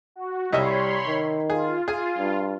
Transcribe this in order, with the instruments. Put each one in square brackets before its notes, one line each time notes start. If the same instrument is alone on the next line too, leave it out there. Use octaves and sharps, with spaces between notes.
[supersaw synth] F#4
[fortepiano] C2 D#5 E5 [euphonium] G3 [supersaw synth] C#5 B5 C6
[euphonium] D#3
[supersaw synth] F4 [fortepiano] G#4
[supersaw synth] F4 [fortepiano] G#4 G#5
[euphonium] G2